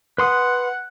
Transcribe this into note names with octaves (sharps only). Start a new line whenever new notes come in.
B4 F#5 C6 D#6